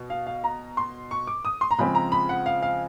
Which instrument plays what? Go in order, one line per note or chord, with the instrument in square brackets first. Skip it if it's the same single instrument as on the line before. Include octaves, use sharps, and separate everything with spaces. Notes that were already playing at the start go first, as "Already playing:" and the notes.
Already playing: [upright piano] B2
F5
F5
A#5
C6
C#6
D6
D#6
C6
A#5
C#3 F3 G#3 C4 B5
A#5
B5
F#5
F5
F5